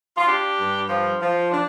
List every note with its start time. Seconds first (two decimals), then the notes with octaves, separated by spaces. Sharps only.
0.17 F4
0.27 D4 G4
0.58 G2
0.89 F3
1.20 F3
1.51 D4